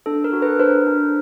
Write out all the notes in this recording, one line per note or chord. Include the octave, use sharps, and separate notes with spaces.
D4 A4
A#4
F#4
A4 B4
D4 A#4 C5
D4